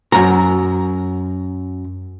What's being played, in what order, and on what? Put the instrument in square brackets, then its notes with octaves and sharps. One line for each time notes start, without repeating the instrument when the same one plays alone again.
[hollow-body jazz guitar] F#2 A#5